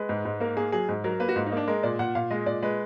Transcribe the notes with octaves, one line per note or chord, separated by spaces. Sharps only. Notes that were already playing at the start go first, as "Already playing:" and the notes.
Already playing: G#3 B4
G#2
G#2
A#3 A#4
A#3 G#4
F#3 G#4
G#2
F#3 A#4
A#3 B4
F#4
G#2 F4
D#4
A#3 D4
G#3 A#4
A#2 D5
A#2 F#5
A#2 F5
G#3 D#5
A#2 D5
G#3 B4